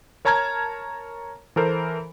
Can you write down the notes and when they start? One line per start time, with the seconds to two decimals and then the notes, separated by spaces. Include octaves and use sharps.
0.25 A#4 C#5 A5 A#5 F6 G#6
1.56 E3 A4 A#4 C5